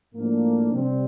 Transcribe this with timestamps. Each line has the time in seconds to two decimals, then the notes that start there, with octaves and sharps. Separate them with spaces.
0.14 A2 F3 A#3 D4
0.70 C3 G3 C4